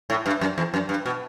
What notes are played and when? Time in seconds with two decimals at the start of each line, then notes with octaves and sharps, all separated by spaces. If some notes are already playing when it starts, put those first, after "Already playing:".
0.10 A2
0.26 G2
0.41 F#2
0.58 E2
0.74 F#2
0.89 G2
1.06 B2